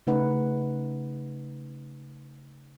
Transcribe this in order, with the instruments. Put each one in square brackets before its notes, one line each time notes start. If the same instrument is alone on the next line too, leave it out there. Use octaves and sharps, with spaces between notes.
[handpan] C#3 A3 D#4 B4 F#5